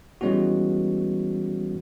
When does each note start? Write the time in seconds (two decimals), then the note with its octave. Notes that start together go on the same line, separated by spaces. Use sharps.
0.21 E3 G3 G#3 B3 C#4 F#4